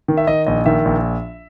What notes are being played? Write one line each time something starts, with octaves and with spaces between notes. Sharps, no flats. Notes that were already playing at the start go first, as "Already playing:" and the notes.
D#3
E5
D#3 D#5
A#1 D#5
D#3 E5
A#1